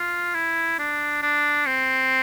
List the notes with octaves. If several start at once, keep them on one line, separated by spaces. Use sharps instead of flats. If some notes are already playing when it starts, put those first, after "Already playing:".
Already playing: F4
E4
D4
D4
C4